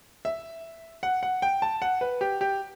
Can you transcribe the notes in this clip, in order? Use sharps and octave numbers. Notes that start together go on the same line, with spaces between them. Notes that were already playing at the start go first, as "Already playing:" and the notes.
E5
F#5
F#5
G5
A5
F#5
B4
G4
G4